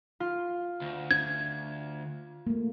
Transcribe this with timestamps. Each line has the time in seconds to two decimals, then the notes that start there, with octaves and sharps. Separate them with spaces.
0.20 F4
0.81 D2
1.11 G#6
2.47 A3 A#3